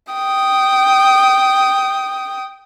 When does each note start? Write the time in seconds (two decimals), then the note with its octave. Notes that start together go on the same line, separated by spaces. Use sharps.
0.13 G5 D#6